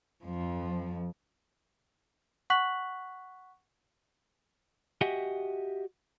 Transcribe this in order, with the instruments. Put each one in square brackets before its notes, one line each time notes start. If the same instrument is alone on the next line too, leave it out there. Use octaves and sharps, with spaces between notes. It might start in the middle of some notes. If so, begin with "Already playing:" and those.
[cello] F2 F3
[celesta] F#5 C#6 F#6 B6 F#7
[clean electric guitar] F#4 G4 D#5 E5 F#5 G#5